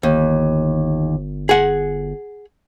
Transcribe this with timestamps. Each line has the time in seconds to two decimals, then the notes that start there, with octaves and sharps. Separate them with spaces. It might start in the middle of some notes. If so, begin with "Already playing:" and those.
0.03 G1 D#2
1.49 G#4 F#5